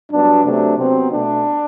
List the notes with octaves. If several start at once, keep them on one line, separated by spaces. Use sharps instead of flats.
G2 F#3 B3 D4
C3 F#3 A3 D4
C3 F#3 B3 C4
B2 A3 D4